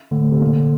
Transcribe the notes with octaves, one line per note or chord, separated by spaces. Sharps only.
A2 D3
C3
A#2